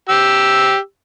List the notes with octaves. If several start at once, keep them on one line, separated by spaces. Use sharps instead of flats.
G4 E6